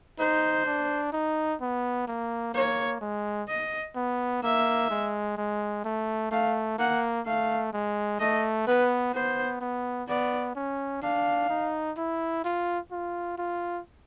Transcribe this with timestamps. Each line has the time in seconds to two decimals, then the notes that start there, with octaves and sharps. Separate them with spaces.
0.19 D#4 C5
0.66 D4
1.12 D#4
1.61 B3
2.08 A#3
2.54 A#3 C#5
3.01 G#3
3.48 D#5
3.95 B3
4.43 A#3 E5
4.90 G#3
5.37 G#3
5.85 A3
6.31 A3 F5
6.79 A#3 F#5
7.26 A3 F5
7.73 G#3
8.20 A3 D#5
8.67 B3 B4
9.14 B3 C5
9.61 B3
10.08 B3 D5
10.56 C#4
11.02 D4 F5
11.49 D#4
11.98 E4
12.44 F4
12.92 F4
13.38 F4